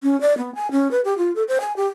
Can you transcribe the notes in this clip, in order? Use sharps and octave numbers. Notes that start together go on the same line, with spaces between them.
C#4
D5
B3
G#5
C#4
B4
G4
F4
A4
C5
G#5
G4